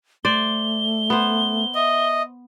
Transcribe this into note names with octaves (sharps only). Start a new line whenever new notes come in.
A3 C5 D5 G7
B3 C5
D#5 E5